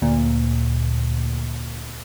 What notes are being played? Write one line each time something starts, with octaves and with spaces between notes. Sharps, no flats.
D2 A#2